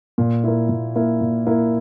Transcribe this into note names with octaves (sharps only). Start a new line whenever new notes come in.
A#2
A#3 E4
A#2
A#3 E4
A#2
A#3 E4